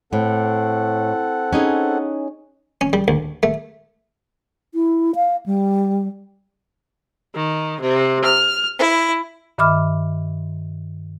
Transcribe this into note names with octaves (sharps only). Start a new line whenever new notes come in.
A2 C4 A4 F#5
C#4 D#4 G#4
C#4
G3
D2
A3
E4
F5
G3
D#3
C3
F6
E4
G2 D#3 E5 B5 D6 F6